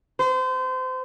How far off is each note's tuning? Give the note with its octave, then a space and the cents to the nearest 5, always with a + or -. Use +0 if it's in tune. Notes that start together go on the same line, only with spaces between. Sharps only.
C5 -30